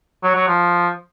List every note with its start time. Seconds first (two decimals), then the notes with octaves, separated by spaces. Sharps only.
0.23 F#3
0.35 F#3
0.47 F3